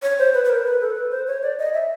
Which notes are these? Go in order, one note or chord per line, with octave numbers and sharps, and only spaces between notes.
C#5
C5
B4
B4
A#4
B4
A4
B4
C5
C#5
D5
D#5
E5